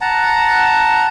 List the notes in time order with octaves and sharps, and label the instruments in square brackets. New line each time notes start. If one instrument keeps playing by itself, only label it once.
[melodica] F#5 A5 A#5